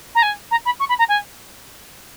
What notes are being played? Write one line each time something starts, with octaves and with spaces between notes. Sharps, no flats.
A#5
G#5
A#5
B5
C#6
B5
A#5
G#5